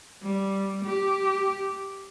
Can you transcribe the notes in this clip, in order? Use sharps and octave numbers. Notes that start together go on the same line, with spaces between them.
G3
G4